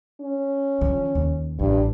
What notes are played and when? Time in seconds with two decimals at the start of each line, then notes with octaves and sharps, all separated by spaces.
0.21 C#4
0.81 D3 F3
1.15 D#2
1.59 A1 G2